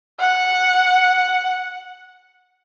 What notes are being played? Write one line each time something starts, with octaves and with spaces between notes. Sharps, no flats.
F#5